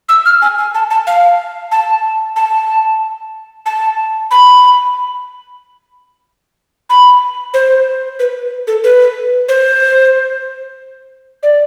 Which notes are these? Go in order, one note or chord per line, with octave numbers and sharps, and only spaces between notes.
E6
F6
G#5
G#5
A5
A5
F5
A5
A5
A5
B5
B5
C5
B4
A4
B4
C5
D5